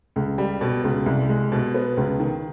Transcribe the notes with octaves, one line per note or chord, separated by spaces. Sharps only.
C#2
G3
B2
C#2
C2
G#3
B2
B3
C#2
D#3